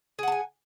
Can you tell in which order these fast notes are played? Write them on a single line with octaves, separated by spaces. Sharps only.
G#4 F#5 A5 G#5